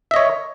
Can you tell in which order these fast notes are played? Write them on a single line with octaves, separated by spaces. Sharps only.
E5 D#5 C#5